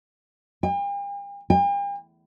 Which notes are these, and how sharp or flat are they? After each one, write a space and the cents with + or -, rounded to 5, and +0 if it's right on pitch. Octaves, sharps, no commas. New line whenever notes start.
G5 +45
G5 +45